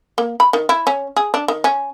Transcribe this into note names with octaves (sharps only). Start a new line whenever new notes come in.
A#3
B5
D#3
E4
C#4
G#4
D4
D#3
C#4